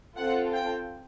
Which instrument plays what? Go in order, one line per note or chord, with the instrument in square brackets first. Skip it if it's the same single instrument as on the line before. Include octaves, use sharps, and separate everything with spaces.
[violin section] C4 F4 A4 F#5
G5